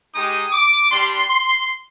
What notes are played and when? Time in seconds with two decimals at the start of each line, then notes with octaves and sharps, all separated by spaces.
0.15 G#3 D#4 G4 D#6
0.52 D6
0.90 G3 D4 G4 C6
1.29 C6